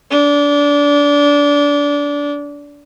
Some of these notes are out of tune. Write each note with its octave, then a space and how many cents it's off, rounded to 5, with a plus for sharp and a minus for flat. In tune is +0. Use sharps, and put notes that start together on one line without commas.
D4 -25